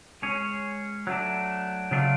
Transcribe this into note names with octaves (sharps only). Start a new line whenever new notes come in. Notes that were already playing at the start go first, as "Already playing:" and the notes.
G#3 C#4 G#4 C#5
F#3 A3 D4
C#3 F#3 A3 D4 F4